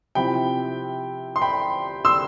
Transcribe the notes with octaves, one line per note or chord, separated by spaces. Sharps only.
C3 F3 C4 E4 G5 B5
C6
G5 B5
C6 E6